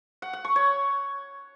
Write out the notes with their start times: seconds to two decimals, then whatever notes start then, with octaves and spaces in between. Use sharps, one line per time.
0.22 F#5
0.33 F#5
0.45 C#6
0.56 C#5